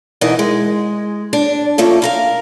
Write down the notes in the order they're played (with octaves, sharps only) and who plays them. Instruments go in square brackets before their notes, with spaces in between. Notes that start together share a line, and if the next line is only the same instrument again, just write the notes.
[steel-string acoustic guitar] G#2 B2 E3 D#4 A#4 D#5
G#3
D4
C#3 F3 A3 A#3
E4 A#4 F5